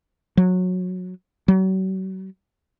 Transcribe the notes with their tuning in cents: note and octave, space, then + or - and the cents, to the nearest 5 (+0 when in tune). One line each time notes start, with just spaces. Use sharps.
F#3 -20
F#3 +40